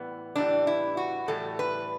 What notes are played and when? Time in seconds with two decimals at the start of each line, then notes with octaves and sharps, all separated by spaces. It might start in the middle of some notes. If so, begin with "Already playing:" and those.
Already playing: A2 E3 G3 B3
0.36 A2 E3 G3 D4
0.67 E4
0.97 F#4
1.28 A2 E3 G3 A4
1.59 B4